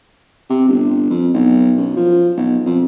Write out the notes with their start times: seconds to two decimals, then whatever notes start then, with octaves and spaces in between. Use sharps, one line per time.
0.50 C3
0.68 G1
1.10 F2
1.34 B1
1.77 F#2
1.96 F3
2.37 B1
2.66 F2